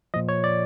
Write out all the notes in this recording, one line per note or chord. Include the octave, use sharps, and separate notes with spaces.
A#2 F3 D#5
C#5
D5